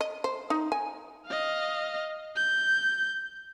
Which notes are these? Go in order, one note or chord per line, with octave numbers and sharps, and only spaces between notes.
D#5
C5
D#4
G#5
D#5 F5
G6